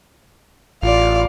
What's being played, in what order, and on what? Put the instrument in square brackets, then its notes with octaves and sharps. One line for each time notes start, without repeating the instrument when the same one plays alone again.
[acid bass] A1 [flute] F4 [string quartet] D5 F5